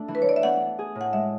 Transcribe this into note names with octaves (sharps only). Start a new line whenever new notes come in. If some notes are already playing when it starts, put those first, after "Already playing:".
Already playing: A3 D4 A4
E3
B4
C#5
E3 D5
E5
B3 F#5
D4
G#4
A2
F#5
G#3 E5